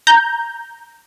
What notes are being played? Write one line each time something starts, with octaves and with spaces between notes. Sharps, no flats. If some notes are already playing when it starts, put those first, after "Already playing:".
A#5 G6